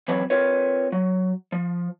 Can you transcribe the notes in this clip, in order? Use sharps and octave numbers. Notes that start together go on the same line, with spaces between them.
E3 F#3 C4 B4 C#5 B5
C4 F4 A#4 B4 C#5
F#3
F3